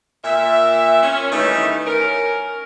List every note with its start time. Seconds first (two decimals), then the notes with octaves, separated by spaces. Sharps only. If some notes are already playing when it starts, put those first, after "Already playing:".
0.24 A#2 E5
1.03 C#4
1.32 D#3 E3 G3 A3 D#4
1.85 C#4 A#4